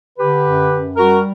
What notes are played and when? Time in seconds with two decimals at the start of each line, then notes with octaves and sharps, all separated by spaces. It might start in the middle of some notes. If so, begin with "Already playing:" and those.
0.19 D3 G4 B4
0.46 F#2
0.72 F#2
0.97 G3 F#4 A#4